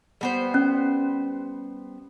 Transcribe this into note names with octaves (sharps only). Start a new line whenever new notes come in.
G3 B3 C5
C#4